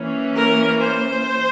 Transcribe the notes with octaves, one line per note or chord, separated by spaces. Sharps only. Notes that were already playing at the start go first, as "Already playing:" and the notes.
Already playing: E3 A#3 C#4
A#4
C5